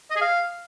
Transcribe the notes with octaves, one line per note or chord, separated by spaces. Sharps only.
D#5
G#4
F5